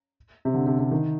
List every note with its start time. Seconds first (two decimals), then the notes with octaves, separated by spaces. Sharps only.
0.45 C3
0.54 D3
0.67 C3
0.79 C3
0.91 D#3